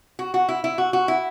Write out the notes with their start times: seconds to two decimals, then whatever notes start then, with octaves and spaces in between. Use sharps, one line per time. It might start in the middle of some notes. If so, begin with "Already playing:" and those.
0.19 F#4
0.34 F#4
0.49 E4
0.64 E4
0.78 F#4
0.93 F#4
1.08 E4